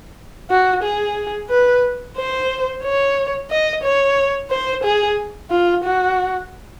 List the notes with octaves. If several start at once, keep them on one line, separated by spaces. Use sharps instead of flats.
F#4
G#4
B4
C5
C#5
D#5
C#5
C5
G#4
F4
F#4